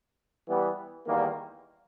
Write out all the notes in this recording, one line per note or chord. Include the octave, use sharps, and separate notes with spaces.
E3 G3 B3
E2 D#3 G3 A#3